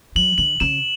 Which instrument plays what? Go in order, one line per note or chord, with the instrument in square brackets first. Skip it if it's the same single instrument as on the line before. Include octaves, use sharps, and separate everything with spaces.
[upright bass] F#3 [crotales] F#7
[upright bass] D3 [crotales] F#7
[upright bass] C#3 [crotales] E7